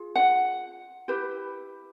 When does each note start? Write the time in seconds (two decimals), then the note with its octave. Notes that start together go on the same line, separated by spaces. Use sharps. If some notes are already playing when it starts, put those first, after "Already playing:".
Already playing: F4 G#4
0.16 F#5
1.08 E4 G4 B4